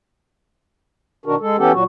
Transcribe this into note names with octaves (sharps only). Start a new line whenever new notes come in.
B2 D#3 D4 F#4 A#4
G#3 A4
E3 B3 C#4 G4 A4
A#2 F#3 F#4